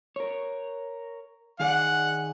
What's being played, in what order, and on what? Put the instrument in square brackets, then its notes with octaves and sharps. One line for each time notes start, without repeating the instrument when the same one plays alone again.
[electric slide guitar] A#4 C#5
[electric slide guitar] D#3 G#4 D5 [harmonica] F#5